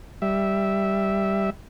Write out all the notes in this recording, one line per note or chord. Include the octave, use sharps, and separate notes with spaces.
G3 E5